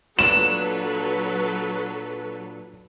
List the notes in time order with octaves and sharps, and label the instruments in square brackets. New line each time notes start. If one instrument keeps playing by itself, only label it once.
[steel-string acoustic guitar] A#2 D4 [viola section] F#3 A4 B4 [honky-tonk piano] E7